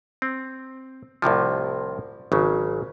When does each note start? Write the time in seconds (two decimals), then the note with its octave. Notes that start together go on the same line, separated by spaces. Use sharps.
0.22 C4
1.22 C2 A2 C3 F3
2.32 G#1 C#3 F#3